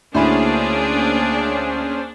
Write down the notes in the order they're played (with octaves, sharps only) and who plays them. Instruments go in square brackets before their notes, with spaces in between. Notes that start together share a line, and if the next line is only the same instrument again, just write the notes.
[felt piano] D2 E4 B5 [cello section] A#3 G#4 [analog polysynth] C#4 C5 [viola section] D4